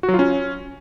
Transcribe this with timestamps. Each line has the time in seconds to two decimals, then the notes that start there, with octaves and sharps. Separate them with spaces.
0.03 F#4
0.08 F#3
0.14 F4
0.19 C#4